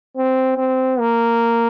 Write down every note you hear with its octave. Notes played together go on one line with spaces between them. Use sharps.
C4
C4
A#3